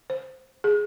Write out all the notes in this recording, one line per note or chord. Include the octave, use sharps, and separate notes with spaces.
C5
G#4